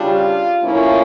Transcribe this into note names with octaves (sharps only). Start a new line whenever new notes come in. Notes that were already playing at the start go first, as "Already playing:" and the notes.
Already playing: C#3 G3 D4 F4
A2 F3 A#3 C#4 E4